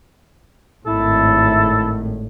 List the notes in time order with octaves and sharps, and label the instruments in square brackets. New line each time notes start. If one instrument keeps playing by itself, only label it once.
[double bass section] G#1 A2 [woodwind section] E4 A4